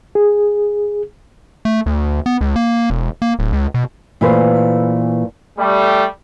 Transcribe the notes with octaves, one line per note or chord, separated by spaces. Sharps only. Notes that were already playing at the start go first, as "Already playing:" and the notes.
G#4
A3
D2
B3
C#2
A#3
E1
A#3
D1
C#2
B2
A#2 E3 A3 F4 B4 C5
G3 A3